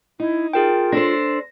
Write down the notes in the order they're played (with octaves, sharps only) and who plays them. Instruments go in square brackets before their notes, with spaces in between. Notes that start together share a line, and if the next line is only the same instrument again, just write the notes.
[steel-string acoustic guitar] D#4 [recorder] E4
[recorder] F4 [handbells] G#4 A#4 G5
[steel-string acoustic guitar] D4 A4 C5 [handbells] A#6